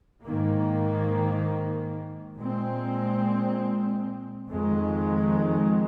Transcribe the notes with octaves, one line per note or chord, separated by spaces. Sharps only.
G#2 D#3 A#3
A#2 G#3 C4
F2 D#3 G#3